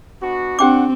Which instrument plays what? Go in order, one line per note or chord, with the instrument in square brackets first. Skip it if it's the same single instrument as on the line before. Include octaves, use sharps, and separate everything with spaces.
[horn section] B3 D4 F#4
[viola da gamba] C4 [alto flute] D4 [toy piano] G4 G5 D6 [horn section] F#5